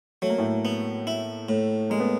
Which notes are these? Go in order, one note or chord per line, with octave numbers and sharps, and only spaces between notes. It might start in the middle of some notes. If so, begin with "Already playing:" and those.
F#3 A3
A#3
A2 A3
B3
E4
A2
G#3 A#3
B3